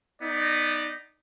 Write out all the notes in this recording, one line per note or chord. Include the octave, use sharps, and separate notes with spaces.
B3 D#4 D5